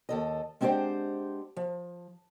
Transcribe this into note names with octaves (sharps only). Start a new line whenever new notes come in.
D#2 A4 D#5
G#3 C4 D4 G4 C5 F#5
F3